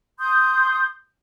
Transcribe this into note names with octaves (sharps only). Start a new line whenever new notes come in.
C6 D#6 G6